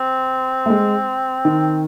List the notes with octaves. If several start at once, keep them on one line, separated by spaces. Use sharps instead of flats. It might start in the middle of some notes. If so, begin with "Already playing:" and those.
Already playing: C4
A3
G#3
D#3